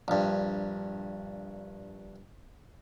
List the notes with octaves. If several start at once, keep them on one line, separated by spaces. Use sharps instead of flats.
A#1 G2